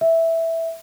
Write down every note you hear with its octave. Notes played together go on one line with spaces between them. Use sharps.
E5